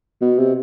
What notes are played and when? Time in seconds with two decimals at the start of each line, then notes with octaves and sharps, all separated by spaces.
0.21 B2
0.38 C3